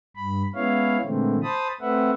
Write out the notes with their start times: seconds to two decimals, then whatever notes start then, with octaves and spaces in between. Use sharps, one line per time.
0.16 G2 B5
0.55 G#3 B3 C#4 E4 C#5 F5
1.04 A#2 D3 E3 G#3 A3 C4
1.43 C5 A5 B5 D#6
1.81 A3 C4 B4 E5 F#5